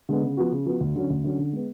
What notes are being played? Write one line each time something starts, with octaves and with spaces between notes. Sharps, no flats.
D3 G#3 B3
C#3
F3 B3 F#4
C#3
F3 B3 F#4
D2
D3 F#3 C#4
D2
D3 F#3 C#4
D3
G#3 B3